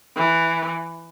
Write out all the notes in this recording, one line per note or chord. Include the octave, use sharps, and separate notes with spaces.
E3